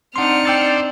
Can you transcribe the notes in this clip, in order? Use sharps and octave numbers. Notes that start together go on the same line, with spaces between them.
C4 D4 D#4 F#5 C6 F6 C#7
C5 D5 G5 E6 A6